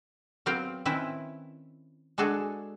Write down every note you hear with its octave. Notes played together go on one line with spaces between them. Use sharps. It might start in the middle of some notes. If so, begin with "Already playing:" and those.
F#3 B3 C4 F5 G5
D#3 C4 C#4 E4 B4
G#3 D4 F#4 G#4 A4